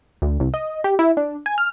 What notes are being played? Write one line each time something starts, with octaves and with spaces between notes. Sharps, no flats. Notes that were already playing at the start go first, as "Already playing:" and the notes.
D2
C2
D#5
G4
E4
D4
G#5
F6